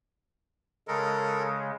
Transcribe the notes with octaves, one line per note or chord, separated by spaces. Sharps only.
C#3 G#3 A4 A#4